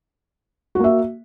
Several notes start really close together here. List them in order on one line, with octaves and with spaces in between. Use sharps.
F#4 A#3 E5